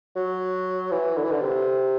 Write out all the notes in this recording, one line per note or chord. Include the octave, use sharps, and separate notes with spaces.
F#3
E3
D3
E3
D3
C3